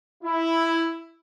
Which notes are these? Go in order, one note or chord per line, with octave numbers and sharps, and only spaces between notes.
E4